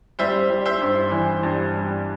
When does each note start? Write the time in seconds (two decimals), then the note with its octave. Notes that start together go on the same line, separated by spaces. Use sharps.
0.19 G3 C5 E5
0.50 G3
0.65 C5 E5
0.81 G2
1.11 E3
1.43 G2
1.74 G3